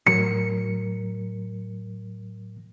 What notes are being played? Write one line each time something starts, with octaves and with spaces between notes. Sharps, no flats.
A2 F#3 A#4 C#7